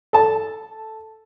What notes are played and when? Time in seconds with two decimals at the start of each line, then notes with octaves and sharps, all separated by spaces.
0.13 A4 A5